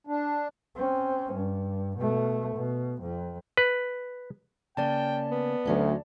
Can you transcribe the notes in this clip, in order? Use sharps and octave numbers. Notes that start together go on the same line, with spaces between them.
D4
C4 C#4
G2
B2 A3
B2
F2
B4
C#3 A#3 C#4 D5 G5 A5
B3
D2 F#3 C#4 D#4